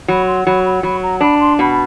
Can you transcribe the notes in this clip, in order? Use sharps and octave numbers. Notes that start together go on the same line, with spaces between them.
F#3 B5
C6
F#3 B5
B5
F#3 B5
A#5
D4 B5
C6
B2 B5